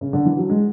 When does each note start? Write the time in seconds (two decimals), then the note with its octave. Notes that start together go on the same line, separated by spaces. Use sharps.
0.01 C#3
0.13 D3
0.25 E3
0.37 F#3
0.49 G#3